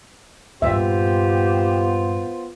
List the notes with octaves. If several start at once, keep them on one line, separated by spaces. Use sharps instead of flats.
G2 A#2 B3 F4 G4 C5 E5 G5